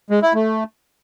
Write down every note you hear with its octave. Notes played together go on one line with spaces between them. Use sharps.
G#3
E4
A3